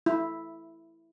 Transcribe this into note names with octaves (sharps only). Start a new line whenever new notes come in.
E4